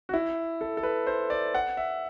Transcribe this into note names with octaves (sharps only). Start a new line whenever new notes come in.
F#4
E4
A4
A4
B4
C5
D5
F#5
E5